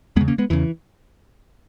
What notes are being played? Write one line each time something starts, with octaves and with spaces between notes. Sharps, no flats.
E2 C#3 G#3 B3
A#3 C#4
G#3 B3
E2 C#3 E3